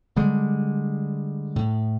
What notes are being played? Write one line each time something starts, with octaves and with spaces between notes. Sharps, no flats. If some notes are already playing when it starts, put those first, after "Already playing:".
D3 G3 G#3
A2